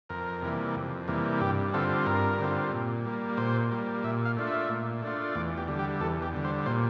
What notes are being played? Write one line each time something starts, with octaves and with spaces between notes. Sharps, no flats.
F2 A#4
C3 E3 G3 A#3
F2
C3 E3 G3 A#3
G2 G4
D3 G3 C4 F4 A4
G2 A#4
D3 G3 C4 F4
A#2
G3 A#3
A#2 C5
G3 A#3
A#2 E5
F5
A3 D4 F4
E5
A#2
A3 D4 F4
E2 D5
G4
D3 G3
G4
E2 A4
G4
D3 G3
C5
A#2 C5